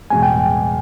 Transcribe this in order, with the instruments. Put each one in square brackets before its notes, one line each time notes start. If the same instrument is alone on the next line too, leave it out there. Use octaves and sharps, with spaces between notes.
[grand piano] E2 B2 G#3 [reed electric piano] G#5
[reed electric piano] G5